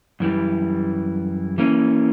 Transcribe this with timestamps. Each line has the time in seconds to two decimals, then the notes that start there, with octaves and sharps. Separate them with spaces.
0.20 F#2 E3 G3
1.58 E3 A#3 C#4